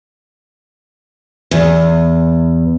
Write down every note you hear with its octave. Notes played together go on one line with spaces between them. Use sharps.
E2